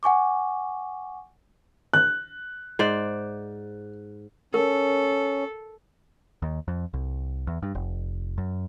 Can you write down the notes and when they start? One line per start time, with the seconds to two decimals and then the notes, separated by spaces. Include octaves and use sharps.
0.03 F#5 G#5 C#6 D6
1.93 F#6
2.79 G#2 C5 D5
4.54 C#4 A4 A#4
6.42 D#2
6.68 F2
6.93 C2
7.47 E2
7.63 G2
7.75 F1
8.38 F#2